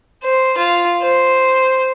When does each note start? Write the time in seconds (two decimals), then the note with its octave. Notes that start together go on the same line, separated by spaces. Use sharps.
0.24 C5
0.58 F4
1.02 C5